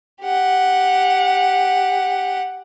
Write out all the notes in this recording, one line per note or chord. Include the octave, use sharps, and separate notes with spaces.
G4 F#5